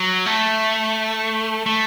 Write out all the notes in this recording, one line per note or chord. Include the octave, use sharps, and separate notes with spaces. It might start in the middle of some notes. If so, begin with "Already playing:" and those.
Already playing: F#3
A3
A3